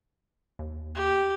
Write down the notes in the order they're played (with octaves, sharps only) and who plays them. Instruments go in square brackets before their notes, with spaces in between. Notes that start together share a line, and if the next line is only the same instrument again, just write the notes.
[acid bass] D#2
[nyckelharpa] G4